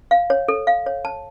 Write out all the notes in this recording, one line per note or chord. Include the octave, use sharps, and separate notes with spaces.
F5
C#5
A4
F5
C#5
A5